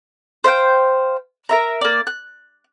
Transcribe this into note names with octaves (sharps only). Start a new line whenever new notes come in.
C5 E5 F5 G5
A#4 E5 A#5
A#3 D5
F#6